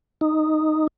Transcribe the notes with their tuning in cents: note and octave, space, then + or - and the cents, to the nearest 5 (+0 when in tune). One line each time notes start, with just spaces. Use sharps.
D#4 -5